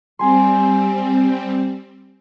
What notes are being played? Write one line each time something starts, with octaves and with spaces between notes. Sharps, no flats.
G3 C4 G#5 C6